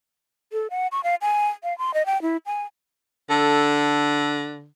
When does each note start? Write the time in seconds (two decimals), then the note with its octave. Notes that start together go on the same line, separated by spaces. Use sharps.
0.53 A4
0.70 F#5
0.92 C#6
1.04 F5
1.22 G#5
1.63 F5
1.78 C6
1.94 D#5
2.06 G5
2.22 E4
2.46 G#5
3.30 D3 A4